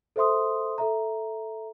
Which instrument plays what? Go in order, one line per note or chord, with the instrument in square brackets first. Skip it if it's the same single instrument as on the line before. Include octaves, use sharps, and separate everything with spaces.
[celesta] A4 C5 E5 C6 D#6
A4 E5 A#5